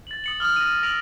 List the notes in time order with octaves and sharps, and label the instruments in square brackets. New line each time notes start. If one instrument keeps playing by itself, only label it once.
[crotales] A6 F#7
D#6 C#7 F#7
D#6 F6 F#7
A#6 D#7
D#6 E6 A#6 D7 F7 F#7